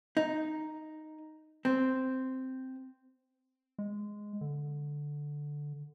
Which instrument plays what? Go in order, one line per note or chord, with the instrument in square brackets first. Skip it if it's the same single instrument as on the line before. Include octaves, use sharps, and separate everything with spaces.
[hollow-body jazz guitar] D#4
C4
[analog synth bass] G#3
D3